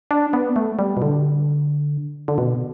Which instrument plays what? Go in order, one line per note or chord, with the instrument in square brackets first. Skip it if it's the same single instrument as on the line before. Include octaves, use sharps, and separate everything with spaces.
[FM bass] D4
B3
A3
G3
B2
D3
D3
B2